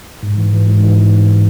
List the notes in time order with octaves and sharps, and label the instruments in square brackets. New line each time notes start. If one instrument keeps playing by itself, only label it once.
[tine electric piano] G#2
E3
E3
G#2
E3